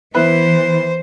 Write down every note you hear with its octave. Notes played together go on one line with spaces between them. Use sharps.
E3 B3 E4 B4 C5